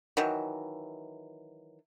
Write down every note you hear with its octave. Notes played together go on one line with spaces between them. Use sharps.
D#3 E3 F#3